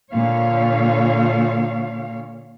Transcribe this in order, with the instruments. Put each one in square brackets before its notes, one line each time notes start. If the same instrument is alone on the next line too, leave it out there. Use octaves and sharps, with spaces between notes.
[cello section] A#2 D3 C#5 F5